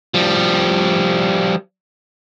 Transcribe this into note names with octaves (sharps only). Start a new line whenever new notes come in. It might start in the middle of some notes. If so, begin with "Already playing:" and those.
F3 G3